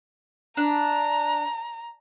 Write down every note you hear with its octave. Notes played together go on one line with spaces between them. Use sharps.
D4 A#5